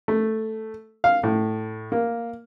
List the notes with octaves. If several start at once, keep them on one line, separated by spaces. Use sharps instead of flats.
A3
F5
A2
A#3